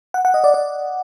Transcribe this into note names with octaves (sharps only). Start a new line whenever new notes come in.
F#5
F#5
D#5
D5
D5